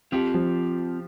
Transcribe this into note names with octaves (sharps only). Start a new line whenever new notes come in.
C4 F4 G4
F3